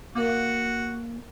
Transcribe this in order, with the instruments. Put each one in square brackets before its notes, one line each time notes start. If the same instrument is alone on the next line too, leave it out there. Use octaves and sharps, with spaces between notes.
[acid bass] A#3 [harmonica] F#4 [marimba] A#4 D6